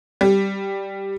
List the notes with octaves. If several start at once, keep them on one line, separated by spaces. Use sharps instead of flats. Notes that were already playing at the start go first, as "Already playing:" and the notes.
G3